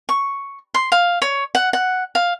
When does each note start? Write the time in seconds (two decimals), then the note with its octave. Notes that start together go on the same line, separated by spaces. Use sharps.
0.09 C#6
0.74 C6
0.92 F5
1.22 C#5
1.55 F#5
1.73 F#5
2.15 F5